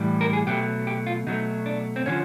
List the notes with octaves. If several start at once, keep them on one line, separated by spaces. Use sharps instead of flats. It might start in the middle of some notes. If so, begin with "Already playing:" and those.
Already playing: A2 E3 G3
A#4
G#4
B2 F#3 A3 G4
G4
F4
B2 F#3 A3 D#4
D4
C4
D3 F3 C#4